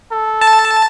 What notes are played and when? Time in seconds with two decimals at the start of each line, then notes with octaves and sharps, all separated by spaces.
0.12 A4
0.42 A5